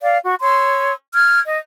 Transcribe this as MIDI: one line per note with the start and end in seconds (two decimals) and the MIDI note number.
0.02 0.17 74
0.02 0.17 77
0.22 0.34 66
0.41 0.94 73
0.41 0.94 84
0.41 0.94 88
1.15 1.39 89
1.15 1.39 92
1.45 1.58 75